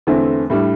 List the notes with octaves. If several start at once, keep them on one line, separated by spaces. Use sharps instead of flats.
E2 D3 A3 C4 E4
A2 G3 D4